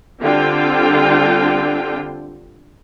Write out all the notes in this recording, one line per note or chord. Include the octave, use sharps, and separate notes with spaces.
D3 G3 C4 F4 G5